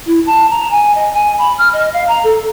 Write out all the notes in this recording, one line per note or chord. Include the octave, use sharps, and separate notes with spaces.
E4
A5
A#5
G#5
D#5
G#5
B5
F6
D#5
F5
A#5
A4